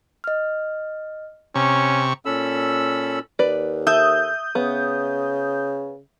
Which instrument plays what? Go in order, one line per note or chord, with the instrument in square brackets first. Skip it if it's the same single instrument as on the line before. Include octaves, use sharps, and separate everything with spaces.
[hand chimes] D#5 F6
[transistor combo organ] C3 C#6 [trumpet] C#4 [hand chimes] A#5 C#7
[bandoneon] A#2 C#4 A4 B5 E6
[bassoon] D#2 [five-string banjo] B4 D5
[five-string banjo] A4 [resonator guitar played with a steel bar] E5 [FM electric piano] D#6 G6
[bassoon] C#3 [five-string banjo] B3